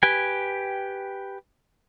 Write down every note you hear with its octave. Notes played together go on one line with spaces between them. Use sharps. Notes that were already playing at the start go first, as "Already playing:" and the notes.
G4 B4 G5 G#5